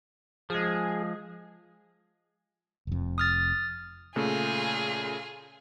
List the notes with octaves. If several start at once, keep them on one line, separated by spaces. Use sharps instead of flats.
F3 G#3 G#4
F1 F2
D#6 F6 A6
A#2 C#3 A3 F4 G#4